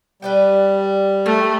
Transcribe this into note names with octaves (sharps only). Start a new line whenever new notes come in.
G3 B4 D5 G5
A3 A#4